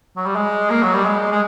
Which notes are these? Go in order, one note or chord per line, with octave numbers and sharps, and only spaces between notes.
F#3
G3
G#3
A#3
F#3
G3
G#3
G#3